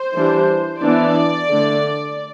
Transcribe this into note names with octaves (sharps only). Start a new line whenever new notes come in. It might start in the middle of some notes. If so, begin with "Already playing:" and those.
Already playing: C5
E3 G3 D4
E3 B3 D4 D5
D3 A3 D4